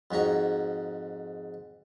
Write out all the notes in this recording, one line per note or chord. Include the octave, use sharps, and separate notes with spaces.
F2 G#2 F#4 A#5